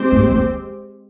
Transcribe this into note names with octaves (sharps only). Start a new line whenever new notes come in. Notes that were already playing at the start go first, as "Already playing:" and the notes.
Already playing: G#3 C4 G4 C5
G#2
F2